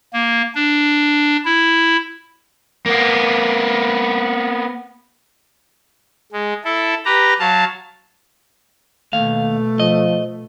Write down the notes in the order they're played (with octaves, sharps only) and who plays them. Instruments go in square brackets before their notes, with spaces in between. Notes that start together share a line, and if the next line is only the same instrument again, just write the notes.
[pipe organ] A#3
D4
E4
[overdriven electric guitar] A#3 B3
[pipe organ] G#3
E4 A4
G4 B4 A#5
F#3 F5 A5
[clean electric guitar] D#2 F5 [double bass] B2 A3
[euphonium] F3 [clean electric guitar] D#5